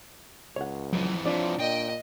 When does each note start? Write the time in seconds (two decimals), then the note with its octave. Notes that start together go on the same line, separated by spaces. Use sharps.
0.56 C#2 C#5 F#5
0.93 F2 E3 F#3
1.26 C3 E3 F3 D4 C#5 D5
1.60 A#2 D#5 G5